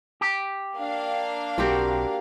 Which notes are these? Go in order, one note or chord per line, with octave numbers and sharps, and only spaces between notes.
G4
A#3 D4 F5
B1 C4 F#4 G4 A#4